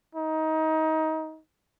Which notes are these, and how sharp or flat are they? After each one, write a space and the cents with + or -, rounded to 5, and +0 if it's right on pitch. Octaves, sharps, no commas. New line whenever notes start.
D#4 +25